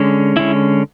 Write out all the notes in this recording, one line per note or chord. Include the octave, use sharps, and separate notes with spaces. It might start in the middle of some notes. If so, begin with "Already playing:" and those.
Already playing: D3 G#3 C#4
D3 G#3 C#4 E4